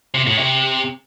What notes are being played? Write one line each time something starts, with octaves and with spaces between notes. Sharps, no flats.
C3
A2
C3